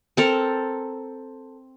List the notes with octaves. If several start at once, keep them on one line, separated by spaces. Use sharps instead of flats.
C4 A4 A#4